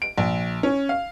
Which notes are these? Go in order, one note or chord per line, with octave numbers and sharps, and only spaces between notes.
D7
A#1
C#4
F5